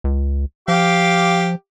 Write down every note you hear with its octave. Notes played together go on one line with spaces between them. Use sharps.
C#2
F3 G4 F5 D6